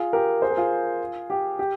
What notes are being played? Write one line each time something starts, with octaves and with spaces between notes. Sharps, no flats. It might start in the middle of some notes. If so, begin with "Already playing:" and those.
Already playing: F4 G#4
G4 A#4
G#4 C5
A#4
F4 G#4
G4
G4